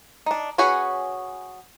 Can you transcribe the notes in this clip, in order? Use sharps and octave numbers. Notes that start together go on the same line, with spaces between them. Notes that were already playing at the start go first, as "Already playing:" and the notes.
D4 D#4
C#4 F#4 G#4 B4 C#5